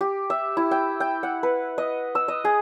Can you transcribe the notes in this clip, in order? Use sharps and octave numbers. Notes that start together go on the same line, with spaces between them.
G4
E5
E4
G5
G5
F#5
B4
D#5
E6
D#5
G#4